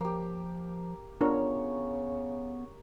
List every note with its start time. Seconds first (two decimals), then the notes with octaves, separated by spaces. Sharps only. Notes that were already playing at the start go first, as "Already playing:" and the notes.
0.01 F3 A#3 G4
1.21 C#3 B3 D4 F4 A#4 C#5